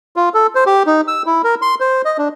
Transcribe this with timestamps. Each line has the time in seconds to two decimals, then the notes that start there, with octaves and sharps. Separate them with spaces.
0.16 F4
0.34 A4
0.55 C5
0.66 G4
0.86 D#4
1.08 E6
1.26 E4
1.44 A#4
1.62 C6
1.80 C5
2.05 D#5
2.18 D4